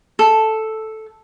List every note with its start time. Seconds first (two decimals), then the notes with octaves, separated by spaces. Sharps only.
0.19 A4